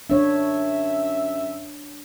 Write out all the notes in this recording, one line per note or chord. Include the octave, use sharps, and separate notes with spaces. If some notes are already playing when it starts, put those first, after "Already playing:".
F#2 D4 C#5 E5